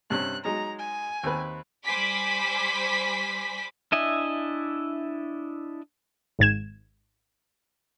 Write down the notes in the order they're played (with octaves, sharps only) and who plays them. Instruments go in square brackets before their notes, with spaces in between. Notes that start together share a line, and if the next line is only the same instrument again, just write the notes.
[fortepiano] G2 C3 C#4 [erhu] F#6
[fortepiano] F#3 G#3 D#4 [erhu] A#5
[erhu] G#5
[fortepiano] D#2 C4 B4
[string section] G3 C5 G#5 B5 D6 B6
[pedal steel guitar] D4 E4 D#5 E5 G#5
[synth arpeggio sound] G#1 G#2 G#6 E7